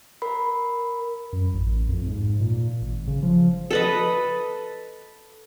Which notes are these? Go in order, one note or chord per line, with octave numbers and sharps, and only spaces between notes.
A#4 B5
F#2
A1
F2
G#2
A#2
G#1
C#3
F3
A4 B4 D#5